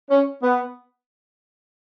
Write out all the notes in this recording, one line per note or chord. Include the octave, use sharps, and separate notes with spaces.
C#4
B3